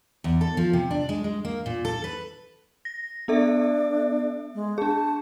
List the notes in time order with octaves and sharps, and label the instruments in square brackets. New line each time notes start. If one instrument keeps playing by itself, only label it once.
[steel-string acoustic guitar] E2
A4
F3
C3
D4
G#3
G#3
A#3
A#2
A4
B4
[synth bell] A#6
[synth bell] B3 A4 E5 [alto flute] D4
[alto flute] G#3
[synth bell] D4 G#4 [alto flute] A5